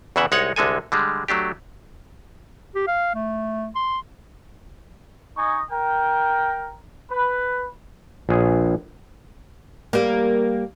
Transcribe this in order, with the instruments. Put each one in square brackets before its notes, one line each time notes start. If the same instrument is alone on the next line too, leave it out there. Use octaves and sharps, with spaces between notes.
[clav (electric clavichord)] E2 C#3 E3 E5 F#5
C2 G#3 D#4 C#5 F#5
C2 D3 G#3 A4 G#5
D3 G3 G#3
F#3 A3 D4 G4
[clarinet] G4
F5
A3
C6
[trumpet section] D#4 D#5 G#5 C#6
A#4 G5
B4
[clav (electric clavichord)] A#1 G#4
[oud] G3 A#3